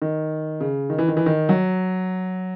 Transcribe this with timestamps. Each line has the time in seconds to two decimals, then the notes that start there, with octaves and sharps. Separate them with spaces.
0.02 D#3
0.61 C#3
0.90 D#3
0.98 E3
1.08 D#3
1.17 E3
1.26 D#3
1.49 F#3